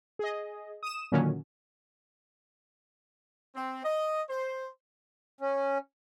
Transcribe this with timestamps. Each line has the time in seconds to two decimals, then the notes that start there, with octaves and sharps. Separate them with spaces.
0.19 G#4 D#5
0.83 D#6 E7
1.12 A#2 D3 D#3 F#3 C#4
3.55 C4
3.84 D#5
4.29 C5
5.41 C#4